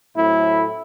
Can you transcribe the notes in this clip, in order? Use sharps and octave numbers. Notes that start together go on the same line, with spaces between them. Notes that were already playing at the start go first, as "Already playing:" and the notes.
A2 F#3 A3 C4 E4